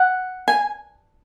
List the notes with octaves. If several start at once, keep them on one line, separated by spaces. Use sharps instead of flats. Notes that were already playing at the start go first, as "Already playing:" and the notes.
Already playing: F#5
G#5